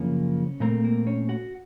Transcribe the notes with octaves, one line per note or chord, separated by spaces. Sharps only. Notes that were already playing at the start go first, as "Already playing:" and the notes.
Already playing: F#2 C#3 F3 A#3 C#4
A#2 A3 A#3 C4 A#4
A#3 A#4
C#4 C#5
F#4 F#5